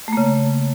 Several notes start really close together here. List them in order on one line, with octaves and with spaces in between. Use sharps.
A3 A#3 C#3